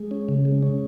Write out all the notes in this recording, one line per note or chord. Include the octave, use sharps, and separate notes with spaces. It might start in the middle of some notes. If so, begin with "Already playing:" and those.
Already playing: G#3
C#4
C#3
G#3
C#4